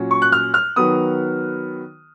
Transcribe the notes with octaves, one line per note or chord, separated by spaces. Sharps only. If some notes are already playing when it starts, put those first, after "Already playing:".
Already playing: A#2 F#3 C#4
C#6
F#6
F6
F6
D#3 F#3 B3 D#6